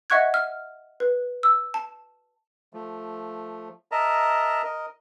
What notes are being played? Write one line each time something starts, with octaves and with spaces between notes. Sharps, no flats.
D#5 E5 F#5 C#6 F#6 G#6
F6
B4
E6
A5
F3 A3
A#4 D#5 E5 A5 A#5
A#4 D#5